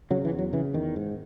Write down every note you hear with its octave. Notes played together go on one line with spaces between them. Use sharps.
C#3 F#3
E3
E2
F#3
C#3 E3
E2 D#3
G#2